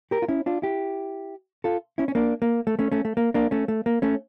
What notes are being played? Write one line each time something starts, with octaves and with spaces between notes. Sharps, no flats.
G4 A#4
F4
C#4 E4
D4 F4
E4 G4
F4 A4
C#4 E4
C#4
A#3 D4
A#3
A3
A3 C#4
A3 C#4
A3
A#3
A#3 D4
A3 C#4
A3
A#3
A3 C#4